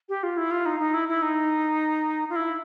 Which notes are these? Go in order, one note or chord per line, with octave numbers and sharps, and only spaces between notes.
G4
F4
E4
F4
D#4
D#4
E4
E4
D#4
F4
E4